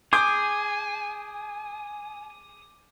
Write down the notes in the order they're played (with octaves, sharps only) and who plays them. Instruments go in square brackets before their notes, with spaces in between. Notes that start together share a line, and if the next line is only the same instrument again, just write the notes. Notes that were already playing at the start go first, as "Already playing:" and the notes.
[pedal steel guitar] G#4 D#6 [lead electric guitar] G#5 [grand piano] D6 G6